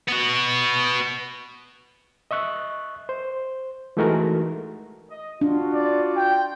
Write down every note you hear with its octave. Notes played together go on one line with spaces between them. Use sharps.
B3 F#4
D#5 E5 C#6 F#6
C5
E3 G#3 A3 D#4 F#4 A#4
D#5
D4 F4 F#4
D5
G5